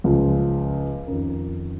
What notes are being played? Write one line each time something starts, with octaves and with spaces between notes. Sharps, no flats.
C#2 C#3 F3
F2 D#3 C#4 A#4